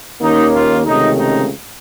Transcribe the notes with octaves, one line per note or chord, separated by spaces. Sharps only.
D#2 D#3 A#3 C#4 D#4
F4
C#2 C3 D#3 A3 C#4 D#4
D#4